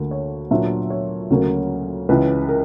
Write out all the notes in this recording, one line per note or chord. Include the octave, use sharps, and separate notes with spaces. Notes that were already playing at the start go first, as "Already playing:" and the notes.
Already playing: D2 D3 A#3
C#5
A#2 F#3 B3 D4 E5
C#5
D2 C#3 F#3 A#3
C#2 C#3 E3 B4
A#4